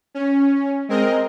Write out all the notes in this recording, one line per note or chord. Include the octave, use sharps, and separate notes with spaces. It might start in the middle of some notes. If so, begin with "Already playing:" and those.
C#4
G#3 C4 A#4 D#5